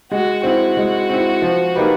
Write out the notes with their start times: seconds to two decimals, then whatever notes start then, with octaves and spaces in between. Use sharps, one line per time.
0.12 G#3 F#4
0.43 C4 E4 F#4
0.77 G#3
1.09 C4 E4
1.42 F3
1.76 A#3 D#4 G4 B4